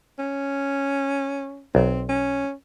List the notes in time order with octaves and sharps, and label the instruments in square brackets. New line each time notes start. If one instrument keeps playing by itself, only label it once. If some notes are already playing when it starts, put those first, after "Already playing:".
[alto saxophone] C#4
[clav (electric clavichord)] B1 [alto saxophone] C4
[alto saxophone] C#4